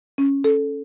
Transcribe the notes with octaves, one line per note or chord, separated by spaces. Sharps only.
C#4
A4